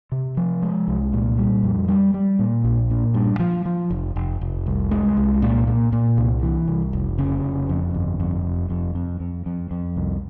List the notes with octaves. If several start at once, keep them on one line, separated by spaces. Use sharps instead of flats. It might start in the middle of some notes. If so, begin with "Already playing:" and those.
C3
F3
G#3
C2
A#2
G3
F2
G3
G3
A#2
A#1
A#2
G2
F3
F3
F1
F1
F1
C2
G#3
C2
A#2
A#2
A#2
C2
E3
C2
F1
C#3
F1
F2
G1
F2
F1
F2
F2
F2
F2
F2
C2